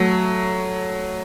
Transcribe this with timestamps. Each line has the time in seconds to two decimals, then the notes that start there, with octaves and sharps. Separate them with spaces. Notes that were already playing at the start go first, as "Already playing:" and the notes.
Already playing: F#3 A3